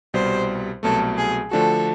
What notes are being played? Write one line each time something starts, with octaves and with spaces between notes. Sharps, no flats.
C2 B2 G3 C5
C2 B2 F#3 A3 A4
G#4
D3 F3 A3 D4 F#4 A4